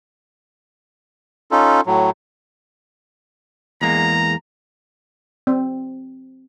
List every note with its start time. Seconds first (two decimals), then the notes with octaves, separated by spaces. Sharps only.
1.52 C#4 D#4 F4 A4
1.86 A2 F#3
3.82 E2 G#3 A#3 A#5
5.47 C4